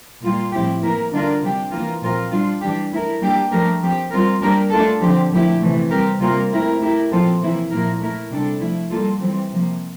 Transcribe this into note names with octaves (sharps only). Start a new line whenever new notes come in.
A#2 G3 A#3 F4
A2 F3 C4 E4 G4
E3 A#3 E4 A#4
D3 G3 D4 F4 A#4
C3 G3 D4 G4
E3 A#3 F4 A#4
A#2 F3 C4 F4 A#4
G3 D4 F4
E3 G3 D4 G4
A3 E4 A#4
G3 A#3 D4 G4
F3 A3 D4 G4 A#4
F3 C4 G4
G3 C4 F4 A#4
G3 A#3 D4 G4 A#4
A3 D4 F4 A4
D3 F3 C4 G4
A#2 F3 A3 E4 G4
C3 E3 A3
G3 C4 G4 A#4
C3 G3 A#3 F4 A#4
A3 C4 E4 A#4
A3 E4 G4 A#4
A#2 F3 C4 F4 A4
C3 E3 A#3 E4
A#2 F3 A#3 E4 A#4
A3 E4 A#4
C3 G3 D4 A4
F3 A3 E4
G3 A#3 F4 A4
E3 G3 C4
C3 F3 A#3